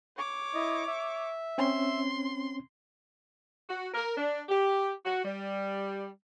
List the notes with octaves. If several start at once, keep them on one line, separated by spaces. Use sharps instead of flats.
C#5 D6
E4 D#5
E5
C4 C#4 C6
F#4
A#4
D4
G4
F#4
G3